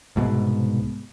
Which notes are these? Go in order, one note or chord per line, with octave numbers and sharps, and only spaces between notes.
C2 G#2 B2